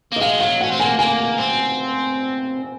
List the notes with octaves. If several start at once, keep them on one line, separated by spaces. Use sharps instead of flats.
A#3
D#5
G#3 F5
F#3 F5
C#4 F#5
C4
A#3 G#5
A#3 G#5
C4